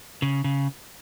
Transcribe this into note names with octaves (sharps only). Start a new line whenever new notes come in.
C#3
C#3